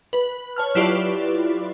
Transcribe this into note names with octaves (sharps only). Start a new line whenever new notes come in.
B4
C#5 A5 F6
F#3 E4 F4 G4 B4 D5